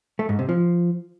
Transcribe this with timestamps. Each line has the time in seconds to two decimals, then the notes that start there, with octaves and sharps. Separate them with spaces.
0.19 A3
0.29 G#2
0.39 C3
0.49 F3